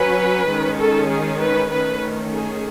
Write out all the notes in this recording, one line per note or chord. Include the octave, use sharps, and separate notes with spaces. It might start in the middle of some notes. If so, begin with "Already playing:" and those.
Already playing: F#3 C#4 B4
D#3 G#3 C#4
A4
G#4
B4
D#3 A3 C#4 B4
G#4